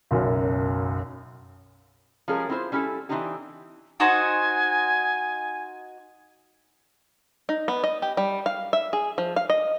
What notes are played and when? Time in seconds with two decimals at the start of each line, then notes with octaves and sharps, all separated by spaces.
0.11 F#1 B1 F#2
2.28 F3 G3 G#3 C#4 G#4 A#4
2.49 C4 E4 F4 A#4 C5
2.72 G3 C#4 E4 F#4 A4
3.09 E3 A#3 C4 D4 D#4 G4
4.00 D#4 F#4 C5 G#5
7.49 D#4
7.68 B3
7.84 D#5
8.02 G4
8.17 G3
8.46 F5
8.73 E5
8.93 G#4
9.18 F3
9.36 F5
9.50 D#5